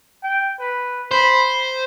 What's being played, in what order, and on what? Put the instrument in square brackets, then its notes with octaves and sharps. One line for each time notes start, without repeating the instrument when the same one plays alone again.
[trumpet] G5
B4
[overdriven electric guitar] C5 [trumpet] B5